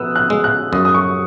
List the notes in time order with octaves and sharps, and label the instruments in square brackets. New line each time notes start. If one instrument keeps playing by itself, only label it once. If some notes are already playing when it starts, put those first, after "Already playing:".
Already playing: [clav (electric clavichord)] B2 B3 [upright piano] D#6 E6 F#6
[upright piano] F#6
[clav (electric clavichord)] G#3
[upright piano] F#6
[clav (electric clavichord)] F#2 [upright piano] D#6
[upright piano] D#6
C#6